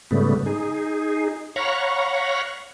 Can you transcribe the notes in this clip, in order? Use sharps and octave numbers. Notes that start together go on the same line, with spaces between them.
G#2 C#3 G3 A3 B3
D#4 G#4
C#5 F5 F#5 A#5 B5 C#6